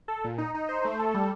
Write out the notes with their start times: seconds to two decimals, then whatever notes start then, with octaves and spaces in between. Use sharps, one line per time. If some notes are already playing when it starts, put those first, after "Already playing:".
0.08 A4
0.24 A#2
0.38 D#4
0.54 D#4
0.69 C5
0.85 A3
0.99 A4
1.14 G3